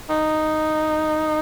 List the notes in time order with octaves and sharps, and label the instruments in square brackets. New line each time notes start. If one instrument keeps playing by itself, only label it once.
[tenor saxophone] D#4